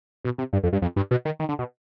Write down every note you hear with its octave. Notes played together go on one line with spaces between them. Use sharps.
B2
C3
G2
F2
G2
F2
G2
B2
D#3
D#3
D3
B2